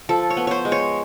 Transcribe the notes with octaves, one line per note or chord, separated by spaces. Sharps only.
F3 A4
C#5
B3
C5 C#5
G#3
C#5